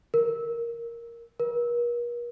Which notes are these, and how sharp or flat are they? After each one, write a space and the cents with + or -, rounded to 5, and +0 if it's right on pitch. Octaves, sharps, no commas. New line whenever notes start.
A#4 +0
A#4 +45